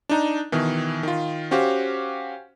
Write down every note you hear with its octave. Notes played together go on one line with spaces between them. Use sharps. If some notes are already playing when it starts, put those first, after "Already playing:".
D4 D#4 A#5
B2 D#3 E3
D#3 F4
C#4 F#4 G4 C5 F5